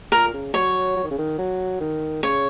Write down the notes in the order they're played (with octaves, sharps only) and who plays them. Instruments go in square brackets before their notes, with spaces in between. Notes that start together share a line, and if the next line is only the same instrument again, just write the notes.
[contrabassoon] A#2 [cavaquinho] A#4
[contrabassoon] C#3
[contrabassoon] F#3 [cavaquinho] C#5
[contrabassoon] F#3
D#3
C#3
D#3
F#3
D#3
[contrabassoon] C#3 [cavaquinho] C#5